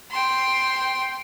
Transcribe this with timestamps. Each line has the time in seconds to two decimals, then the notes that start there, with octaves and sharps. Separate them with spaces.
0.11 G5 C6